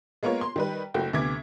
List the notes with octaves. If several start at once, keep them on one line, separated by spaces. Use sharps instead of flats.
G#3 A#3 B3 F4 C#5
C6
D#3 G3 B4
F#1 A3 F#4 G5
D2 C3 B3 D6 G#6 B6